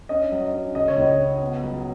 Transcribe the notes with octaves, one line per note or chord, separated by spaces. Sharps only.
C#4 D#5
F#3
D#5
C#4
C#3 D#5
C#5
C#2 D#5
C#4
B3
F#3